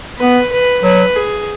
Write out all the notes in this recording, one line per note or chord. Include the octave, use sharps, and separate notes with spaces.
B3 B4
B4
F#3 B4
G#4